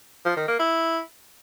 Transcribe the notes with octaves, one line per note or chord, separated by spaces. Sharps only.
F3
D#3
A#3
E4